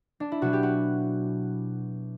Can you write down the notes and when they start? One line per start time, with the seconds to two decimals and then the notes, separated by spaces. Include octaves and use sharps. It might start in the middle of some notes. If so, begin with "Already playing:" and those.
0.20 D4
0.32 E4
0.41 B2 F#3 F#4
0.53 G4
0.63 F#4